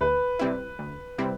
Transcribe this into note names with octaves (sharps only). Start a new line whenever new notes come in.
D2 B4
C3 G3 C4 E4
D2
C3 G3 C4 E4